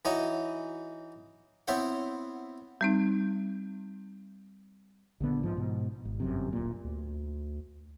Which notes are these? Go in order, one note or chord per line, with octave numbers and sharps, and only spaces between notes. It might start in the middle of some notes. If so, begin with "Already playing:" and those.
E3 D#4 F#4 C#5 D#5
B3 C4 E4 C5 C#5 F#5
G3 C4 D#4
A#1 D3 B3
G#2 F3
G#2 B2
G#1
G1 F#2 C3
D1 A#2
D2